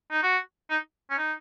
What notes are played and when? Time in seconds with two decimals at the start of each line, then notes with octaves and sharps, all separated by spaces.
0.12 D#4
0.23 F#4
0.70 D#4
1.10 C#4
1.18 D#4